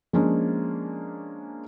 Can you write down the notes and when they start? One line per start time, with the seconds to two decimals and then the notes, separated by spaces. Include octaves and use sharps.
0.13 F3 G#3 A#3 C#4 D4